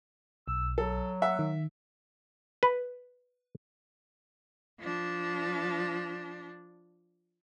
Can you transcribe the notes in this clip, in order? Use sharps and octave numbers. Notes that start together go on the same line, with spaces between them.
B1 E6
F#3 A4
E5 F#5
D#3
B4
F3 D4